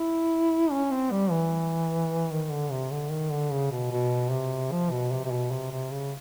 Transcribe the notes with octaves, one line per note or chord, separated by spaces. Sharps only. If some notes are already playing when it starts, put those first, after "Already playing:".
Already playing: E4
C#4
C4
G3
E3
D#3
D3
C3
D3
D#3
D3
C#3
B2
B2
C3
F3
B2
C3
C3
B2
C3
C3
C#3